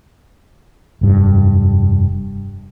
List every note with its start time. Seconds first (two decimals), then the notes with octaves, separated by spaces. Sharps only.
1.01 F1 G2